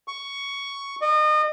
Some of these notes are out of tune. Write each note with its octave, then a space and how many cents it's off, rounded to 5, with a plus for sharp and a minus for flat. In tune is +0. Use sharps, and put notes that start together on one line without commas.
C#6 +10
D#5 -35